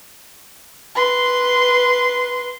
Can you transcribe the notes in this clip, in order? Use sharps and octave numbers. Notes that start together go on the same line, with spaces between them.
B4 C6